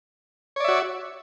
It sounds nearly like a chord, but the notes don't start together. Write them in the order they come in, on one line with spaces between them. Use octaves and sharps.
C#5 D5 E5 F#4